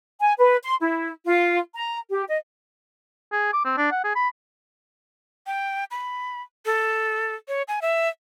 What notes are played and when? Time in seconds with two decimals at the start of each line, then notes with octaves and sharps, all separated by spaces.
0.20 G#5
0.38 B4
0.63 C6
0.81 E4
1.26 F4
1.75 A#5
2.10 G4
2.28 D#5
3.32 G#4
3.53 D6
3.65 C4
3.77 D4
3.91 F#5
4.04 G#4
4.15 B5
5.47 G5
5.91 B5
6.66 A4
7.48 C#5
7.68 G#5
7.82 E5